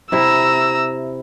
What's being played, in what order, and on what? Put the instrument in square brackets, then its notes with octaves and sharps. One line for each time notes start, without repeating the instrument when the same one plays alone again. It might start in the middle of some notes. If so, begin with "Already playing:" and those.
[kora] C3 E4 [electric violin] A#5 E6